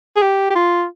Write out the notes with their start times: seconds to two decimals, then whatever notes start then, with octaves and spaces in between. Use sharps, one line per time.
0.16 G#4
0.22 G4
0.50 G4
0.55 F4